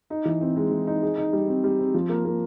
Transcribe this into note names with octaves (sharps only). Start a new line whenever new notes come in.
D#4
E3
C4
G#3
E3
D#4
G#4
D#4
G3
C4
G3
C4
F3
A#3
A#3